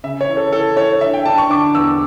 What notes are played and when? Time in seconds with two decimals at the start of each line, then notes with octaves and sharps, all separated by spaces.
0.04 C#3 E5
0.21 C#5
0.28 E3
0.37 A4
0.53 E3 A4
0.77 E4 C#5
1.01 D4 E5
1.14 G5
1.26 D4 A5
1.38 C#6
1.50 D3 D6
1.75 E2 E6